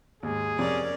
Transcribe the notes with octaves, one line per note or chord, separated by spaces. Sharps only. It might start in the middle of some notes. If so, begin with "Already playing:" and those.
D#2 G#2 G#3 G#4
F2 C3 C#4 A#4 D5